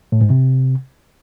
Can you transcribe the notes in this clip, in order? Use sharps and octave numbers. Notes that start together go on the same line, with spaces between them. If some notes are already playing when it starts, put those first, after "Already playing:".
A2
G#2
C3